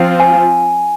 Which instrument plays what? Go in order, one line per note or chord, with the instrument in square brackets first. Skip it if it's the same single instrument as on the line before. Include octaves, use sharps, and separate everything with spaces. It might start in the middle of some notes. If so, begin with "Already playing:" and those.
Already playing: [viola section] F3 C4 F4
[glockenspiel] G#5